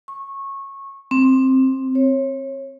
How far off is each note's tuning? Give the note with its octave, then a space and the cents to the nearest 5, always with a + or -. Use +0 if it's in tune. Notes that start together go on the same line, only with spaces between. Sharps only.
C#6 -20
C4 +10
C#5 -25